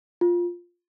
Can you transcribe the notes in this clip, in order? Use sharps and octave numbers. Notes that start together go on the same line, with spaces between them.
F4